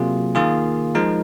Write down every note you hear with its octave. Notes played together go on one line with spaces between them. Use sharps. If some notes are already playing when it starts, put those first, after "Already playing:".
Already playing: C3 F#3 A#3 F4 G#4
D#3 A#3 F4 G#4
F3 G#3 D#4 A#4